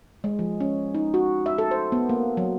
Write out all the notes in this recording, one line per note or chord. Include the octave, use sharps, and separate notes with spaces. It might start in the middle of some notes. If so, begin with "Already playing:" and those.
G#3
F3
C#4
D#4
F#4
E5
A4
C5
B3
A#3
F#3